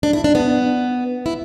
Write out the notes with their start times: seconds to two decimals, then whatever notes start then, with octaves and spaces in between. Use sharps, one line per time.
0.03 D4
0.13 E4
0.24 D4
0.35 B3
1.26 E4